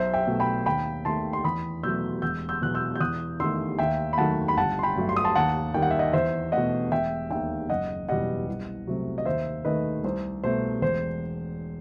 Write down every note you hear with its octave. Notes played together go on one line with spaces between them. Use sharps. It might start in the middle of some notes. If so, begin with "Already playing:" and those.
Already playing: B1 C5 E5
E5 G5
B2 A3
G5 B5
D#2 G5 B5
D#3 A3 A5 C6
C6
E2 B5 D#6
B2 F#3 A3 E6 G6
E1 E6 G6
E6 G6
E2 B2 F#3 F#6
E6 G6
G6
E2 D#6 F#6
D#3 A3 C6 E6
D#2 E5 G5
B5
D#3 F#3 A3 F#5 A5
B5
G1 F#5 A5
C6
G5 B5
G2 F#3 A3
C6
D#6
A5 C6
D#2 F#5 A5
D#3 G3 G5
F#5
E5
D#5 F#5
E2 C5 E5
B2 A3 D#5 F#5
E1 E5 G5
D#2 D#3 E5 G5
F#1 D#5 F#5
E2 B2 G3 D#5 F#5
C2
C3 F#3 A3
D#5
D#2 C5 E5
D#3 A3 B4 D#5
C2 C5
B2 A3 C5
E1 C5